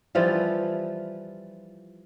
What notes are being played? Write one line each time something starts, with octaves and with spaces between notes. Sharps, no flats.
E3 F3 G3 F4